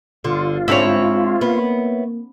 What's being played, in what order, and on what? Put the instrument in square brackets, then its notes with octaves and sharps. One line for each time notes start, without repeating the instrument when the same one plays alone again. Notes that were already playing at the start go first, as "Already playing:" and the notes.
[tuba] G1 [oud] D3 [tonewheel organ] F4
[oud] G#2 C4 D4 [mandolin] E4 C#5
[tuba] A#3 [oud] B3